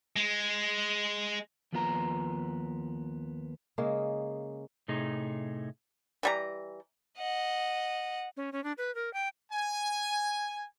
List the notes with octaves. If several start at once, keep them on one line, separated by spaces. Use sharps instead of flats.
G#3
D#2 F3 B3 F4 D#5 A#5
C#3 G#3 A#3
A2 C3 A3 D#4 G#4
E3 G3 A#5
D#5 F#5
C#4
C#4
D4
B4
A#4
G5
G#5